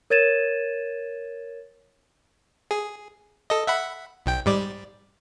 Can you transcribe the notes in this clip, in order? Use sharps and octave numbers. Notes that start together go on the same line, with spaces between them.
A#4 C#5 G#6 A6 D#7 E7
G#4
A4 D#5
E5 F#5 B5
B1 G5
G#2 G3 D5